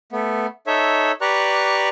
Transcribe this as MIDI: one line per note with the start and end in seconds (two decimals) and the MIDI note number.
0.12 0.47 57
0.12 0.47 59
0.67 1.12 63
0.67 1.12 69
0.67 1.12 73
0.67 1.12 76
1.21 1.89 67
1.21 1.89 71
1.21 1.89 74
1.21 1.89 82
1.21 1.89 85
1.21 1.89 90